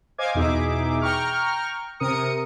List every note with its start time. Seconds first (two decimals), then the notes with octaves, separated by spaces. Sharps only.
0.18 C5 D#5 F5 G#5 D6 G#6
0.35 E2 B2 D#4 G#4 E5 D6
1.01 G5 A#5 C#6 F6
2.00 C3 A#4 D#6 C#7